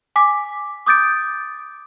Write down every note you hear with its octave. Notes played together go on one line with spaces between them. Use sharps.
G#5 D6 B6
D6 D#6 G6 A6 D7